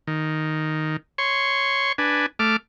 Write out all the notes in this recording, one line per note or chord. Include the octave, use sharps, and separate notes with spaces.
D#3
C#5 C6 C#6
D4 B4 G#5
A3 D6 F6